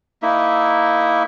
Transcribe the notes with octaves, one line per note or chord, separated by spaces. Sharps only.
A#3 D#4 E4 E5